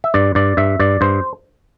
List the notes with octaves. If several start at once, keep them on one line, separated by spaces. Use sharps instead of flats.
E5
G2 D5
G2 D5
G2 E5
G2 D5
G2 C5